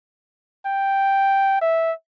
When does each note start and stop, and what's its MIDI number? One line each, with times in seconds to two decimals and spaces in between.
0.66 1.59 79
1.61 1.92 76